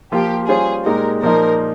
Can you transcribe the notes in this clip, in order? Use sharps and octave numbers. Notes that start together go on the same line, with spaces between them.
F3 A#3 F4 G4
G3 C#4 F4 G#4 C5
A#2 G#3 D#4 G4 A#4
A#2 F3 A#3 D#4 A#4